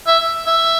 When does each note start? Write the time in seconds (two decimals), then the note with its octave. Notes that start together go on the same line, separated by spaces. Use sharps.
0.07 E5
0.46 E5